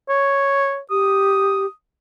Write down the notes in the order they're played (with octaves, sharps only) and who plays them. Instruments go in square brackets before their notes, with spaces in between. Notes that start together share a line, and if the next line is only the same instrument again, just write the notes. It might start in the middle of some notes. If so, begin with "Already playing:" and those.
[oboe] C#5
[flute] G4 [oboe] D#6